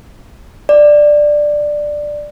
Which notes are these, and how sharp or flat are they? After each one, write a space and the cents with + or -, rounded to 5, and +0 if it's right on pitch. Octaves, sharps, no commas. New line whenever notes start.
D5 +10